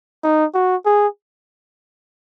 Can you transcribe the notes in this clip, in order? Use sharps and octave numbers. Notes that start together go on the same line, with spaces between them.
D#4
F#4
G#4